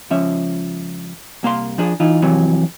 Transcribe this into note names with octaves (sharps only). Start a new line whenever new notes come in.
C#2 F3 C#4 E5
C2 A#3 F5 C6
F3 D4 G#4
E3 D#4 F4
F2 C3 E3 F#3